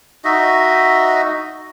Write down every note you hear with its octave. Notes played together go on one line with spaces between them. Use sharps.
D#4 F#4 D#5 E5